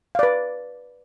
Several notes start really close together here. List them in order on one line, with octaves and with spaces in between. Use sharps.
F5 D5 B4